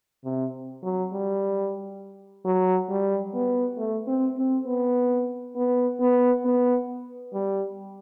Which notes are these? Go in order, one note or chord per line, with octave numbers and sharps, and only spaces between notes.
C3
F#3
G3
F#3
G3
B3
A3
C4
C4
B3
B3
B3
B3
G3